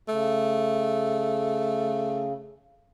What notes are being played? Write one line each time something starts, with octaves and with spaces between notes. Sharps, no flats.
C#3 A3